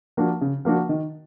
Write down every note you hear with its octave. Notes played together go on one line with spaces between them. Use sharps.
F3 A#3 D4 F#4
C#3
F3 A#3 D4 F#4
D#3